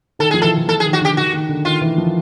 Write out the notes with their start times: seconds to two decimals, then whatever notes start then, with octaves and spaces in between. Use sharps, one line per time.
0.19 D#3 A4
0.31 F3 G#4
0.42 E3 A4
0.57 E3
0.68 F3 A4
0.80 G#4
0.85 D#3
0.93 F#4
1.01 D3 G4
1.17 D#3 F#4
1.33 D#3
1.49 D3
1.65 D#3 F4
1.81 E3
1.98 F3